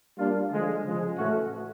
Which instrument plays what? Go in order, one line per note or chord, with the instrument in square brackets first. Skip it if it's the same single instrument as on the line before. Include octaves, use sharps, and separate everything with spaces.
[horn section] G3 A#3 D4 F4
D3 F3 G#3
C#3 F3 G#3
A2 E3 A3 C#4 F#4